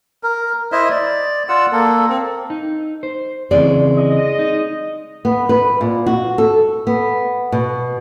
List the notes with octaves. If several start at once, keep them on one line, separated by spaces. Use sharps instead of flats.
A#4
E4 C5 D#5 E5
D5
F4 D5 F#5 E6
A#3 A4
C4
D#4
C5
C#3 E3 G#3 C4 D5
D#5
D#4
B3
B4
A#2
F#4
A4
B3
B2